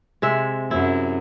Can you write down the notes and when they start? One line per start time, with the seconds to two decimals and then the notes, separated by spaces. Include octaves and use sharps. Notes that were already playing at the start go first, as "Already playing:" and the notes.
0.22 C3 G#3 E5
0.71 F#2 E4